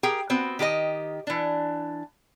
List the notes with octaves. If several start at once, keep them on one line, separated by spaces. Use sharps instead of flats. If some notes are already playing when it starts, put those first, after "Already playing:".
G4 G#4 A#4 G5
B3 C4 F#4
D#3 G4 A#4 D#5
E3 D4